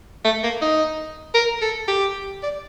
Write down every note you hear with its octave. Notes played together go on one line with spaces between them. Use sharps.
A3
A#3
D#4
A#4
A4
G4
D5